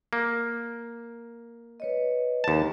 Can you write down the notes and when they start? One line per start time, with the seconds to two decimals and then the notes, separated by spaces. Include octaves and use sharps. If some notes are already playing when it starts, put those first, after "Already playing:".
0.13 A#3
1.80 B4 C#5 D#5
2.44 D#2 A5